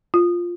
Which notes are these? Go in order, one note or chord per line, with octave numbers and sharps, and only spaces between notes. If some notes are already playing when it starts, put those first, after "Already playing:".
F4